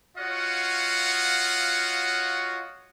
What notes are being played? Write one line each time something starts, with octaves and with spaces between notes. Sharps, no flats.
F4 F#4 C#5 D#5 F5 F#5